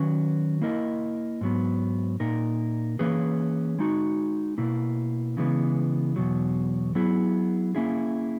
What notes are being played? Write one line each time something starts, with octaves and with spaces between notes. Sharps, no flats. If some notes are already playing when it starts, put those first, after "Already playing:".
Already playing: D#3 F#3 C#4 F#4 B4
A#3 E4 A#4 D#5
G#2 F#3 B3
A#2 A#3 D#4 A#4
E3 A#3 C#4 G#4 B4
G#3 D#4 F#4
B2 A#3 E4
C#3 E3 G#3 B3
E2 B2 F#3
F#3 B3 E4 G#4
A#3 C#4 E4 G#4